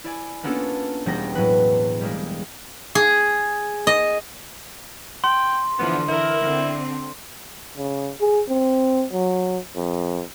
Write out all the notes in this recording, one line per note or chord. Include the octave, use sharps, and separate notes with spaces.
E4 D5 G#5
A#3 B3 C#4 D4 F4 A4
E1 G3 B3 G5 A#6
A2 F#3 B4
G3 G#3 A#3
G#4
D#5
G5 C6
D3 E3 F3 B3
E3 E4 A#4
D3 C4
C#3
G#4
C4
F#3
F2